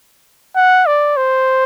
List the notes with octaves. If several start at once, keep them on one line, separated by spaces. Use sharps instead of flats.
F#5
D5
C5